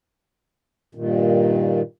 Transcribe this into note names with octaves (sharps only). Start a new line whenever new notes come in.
G2 A#2 D#3